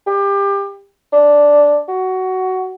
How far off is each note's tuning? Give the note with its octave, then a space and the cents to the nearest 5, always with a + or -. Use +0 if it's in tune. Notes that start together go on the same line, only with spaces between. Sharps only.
G4 +25
D4 -5
F#4 +15